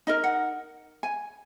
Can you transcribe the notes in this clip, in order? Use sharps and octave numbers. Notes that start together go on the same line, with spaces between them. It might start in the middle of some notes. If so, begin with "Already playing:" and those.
D#4 A#4 D#5
F#5
G#5